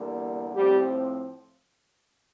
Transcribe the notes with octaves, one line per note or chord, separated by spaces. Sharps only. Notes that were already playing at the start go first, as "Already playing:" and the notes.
Already playing: E2 D3 G3 A#3
A2 F3 G3 C4 G4